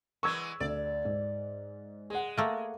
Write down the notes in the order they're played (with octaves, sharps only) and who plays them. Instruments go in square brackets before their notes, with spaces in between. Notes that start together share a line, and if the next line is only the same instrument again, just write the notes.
[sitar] E3 G#3 B3 [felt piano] C#6 E6 G#6
[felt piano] D2 [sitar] D5
[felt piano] G#2
[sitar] G#3 [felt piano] G#4 F#5
[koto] A3 A#3